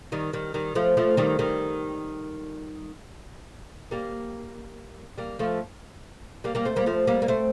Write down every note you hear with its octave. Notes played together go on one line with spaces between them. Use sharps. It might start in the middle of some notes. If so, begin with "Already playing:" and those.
D#3 G3
D#3 G3
D#3 G3
F3 A3
F3 A3
D#3 G3
D#3 G3
G3 A#3
G3 A#3
F3 A3
G3 A#3
G3 A#3
A3 C4
G3 A#3
F3 A3
G3 A#3
A#3
A3 C4